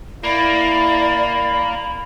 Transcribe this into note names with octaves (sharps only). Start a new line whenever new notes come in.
A#3 E4 D5 B5